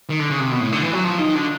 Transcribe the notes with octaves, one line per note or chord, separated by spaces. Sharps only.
D#3
D3
C#3
C3
B2
A2
D3
E3
F#3
F3
D#3
D3